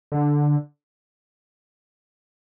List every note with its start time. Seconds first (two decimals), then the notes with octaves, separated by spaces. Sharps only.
0.12 D3